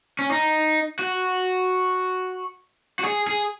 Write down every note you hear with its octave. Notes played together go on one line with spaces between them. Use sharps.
C#4
D#4
F#4
F#4
G#4
G#4